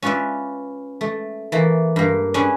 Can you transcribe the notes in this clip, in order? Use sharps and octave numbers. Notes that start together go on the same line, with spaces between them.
C#4 F4 B4 D5 E5
A3
E3 A3 A#3
G2 A#3
C#4 D4 G#4 B4